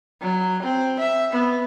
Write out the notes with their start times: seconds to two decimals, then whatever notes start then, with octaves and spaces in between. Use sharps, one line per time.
0.21 F#3
0.63 C4
0.99 E5
1.33 B3